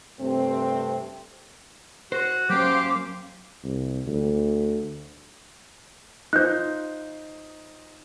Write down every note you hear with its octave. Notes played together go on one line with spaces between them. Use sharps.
G2 C3 A3 C4
F#4 C5
F#3 A#3 C#4 G4 C5 F5 D6
C2
D2
D#4 F4 C5 F#6 G6